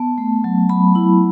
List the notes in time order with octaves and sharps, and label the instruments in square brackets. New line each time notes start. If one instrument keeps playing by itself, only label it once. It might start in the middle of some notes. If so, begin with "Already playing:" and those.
Already playing: [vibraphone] B3 A5
A3
F#3
F#3 B5
E4